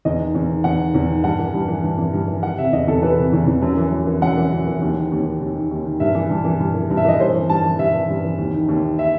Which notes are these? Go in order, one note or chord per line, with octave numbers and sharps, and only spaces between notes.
E2 D#5
D#3
E2
D#3
E2 F#5
D#3
E2
D#3
G2 F#5
E3
G2
E3
G2
E3
G2
E3
E3 F#5
C3 E5
E2 D#5
E2 A4
E3 B4
C3
E2
E2
F#2
E3
F#2
E3
F#2 F#5
E3
F#2
E3
D#2
D#3
D#2
D#3
D#2
D#3
D#2
D#3
G2 E5
E3
G2
E3
G2
E3
G2
E5
E3 D#5
G2 C5
E3
G2 A5
E3
G2 E5
E3
G2
E3
D#2
D#3
D#2
D#3
E5